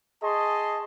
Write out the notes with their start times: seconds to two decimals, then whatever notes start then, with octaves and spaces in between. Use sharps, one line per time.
0.23 G#4 D#5 A5 C6 C#6